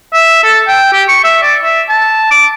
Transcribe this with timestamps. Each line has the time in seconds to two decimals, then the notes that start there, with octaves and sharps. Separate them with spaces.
0.13 E5
0.43 A4
0.68 G5
0.93 G4
1.08 C#6
1.24 E5
1.42 D5
1.63 E5
1.89 A5
2.31 D6